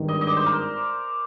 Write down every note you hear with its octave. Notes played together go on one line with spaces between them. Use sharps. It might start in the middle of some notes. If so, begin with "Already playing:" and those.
Already playing: G#1 G2 D#3
D#5
D#5
D5
C5
A#4